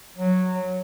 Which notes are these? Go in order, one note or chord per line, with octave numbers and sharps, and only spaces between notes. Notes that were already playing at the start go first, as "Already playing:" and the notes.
F#3